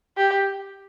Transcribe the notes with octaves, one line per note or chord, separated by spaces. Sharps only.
G4